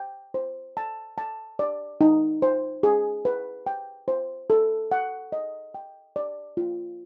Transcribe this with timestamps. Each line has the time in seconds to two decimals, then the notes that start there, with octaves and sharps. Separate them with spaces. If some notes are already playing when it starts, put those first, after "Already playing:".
Already playing: G5
0.34 C5
0.77 A5
1.18 A5
1.59 D5
2.01 D#4
2.42 C5
2.83 G#4
3.25 B4
3.66 G5
4.08 C5
4.50 A4
4.92 F#5
5.32 D#5
5.74 G5
6.16 D5
6.57 F4